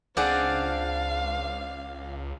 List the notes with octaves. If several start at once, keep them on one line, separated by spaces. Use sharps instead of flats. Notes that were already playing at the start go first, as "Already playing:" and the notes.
C#2 C4 D4 G#4 D5 F5 F#5